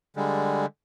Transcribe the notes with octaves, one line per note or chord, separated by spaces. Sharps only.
D3 G3 G#3